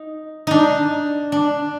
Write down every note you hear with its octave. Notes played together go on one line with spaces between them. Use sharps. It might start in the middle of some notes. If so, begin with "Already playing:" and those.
Already playing: D#4
D4 D#4
D4